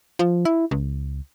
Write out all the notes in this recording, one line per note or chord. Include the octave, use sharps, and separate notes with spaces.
F3
E4
C#2